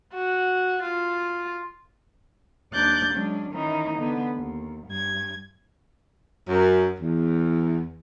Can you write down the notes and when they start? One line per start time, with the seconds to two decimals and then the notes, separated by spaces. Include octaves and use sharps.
0.13 F#4
0.82 F4
2.72 D#2 D4 D6 F#6 G6 A6
3.14 F#3 G#3 C#4 D4
3.50 D#3 E3 C#4 D#4 E4
3.97 D3 B3 B4
4.36 D#2
4.87 G2 G#6
6.48 F#2
7.01 E2